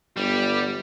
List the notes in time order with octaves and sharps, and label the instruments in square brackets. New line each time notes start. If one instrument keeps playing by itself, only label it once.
[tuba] G1 [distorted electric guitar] G3